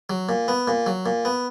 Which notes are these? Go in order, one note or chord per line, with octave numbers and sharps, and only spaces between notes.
F#3
A#2
B3
A#2
F#3
A#2
B3